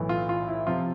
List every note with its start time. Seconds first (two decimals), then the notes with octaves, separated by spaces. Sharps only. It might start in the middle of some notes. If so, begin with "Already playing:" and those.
Already playing: B1 A2 E3
0.09 F4
0.29 F4
0.48 E4
0.67 C3 F3 F4